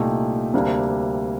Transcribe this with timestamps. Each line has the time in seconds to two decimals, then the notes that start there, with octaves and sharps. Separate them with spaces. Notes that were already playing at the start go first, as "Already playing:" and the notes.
Already playing: C2 A#2 A3 D#4 G4
0.53 D2 C3 G3 A#3 D4